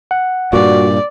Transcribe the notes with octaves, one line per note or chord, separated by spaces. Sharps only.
F#5
G2 A#2 F#4 D5